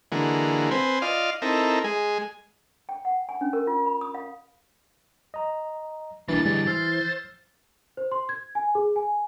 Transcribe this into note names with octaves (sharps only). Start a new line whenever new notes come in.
D3 E3 G#3 A#3 F#4
C4 B4 C5 G#5
F4 D5 D#5 F5
C4 D#4 E4 A4 A#4
G#3 G#4
G5
F#5
G#5
C#4
A#4
F4
B5
D#6
F5
D#5 A#5
C2 E3 G3 A#3 D4 A6
G#2 D3 G3 G#3
C5 E6 F6 C7
C5
C6
G#6
G#5
G#4
G#5